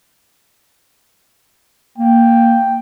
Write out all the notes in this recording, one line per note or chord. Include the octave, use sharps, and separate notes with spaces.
A#3 G5